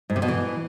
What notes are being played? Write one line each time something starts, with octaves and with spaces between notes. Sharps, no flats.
G#2
C3
B2
E3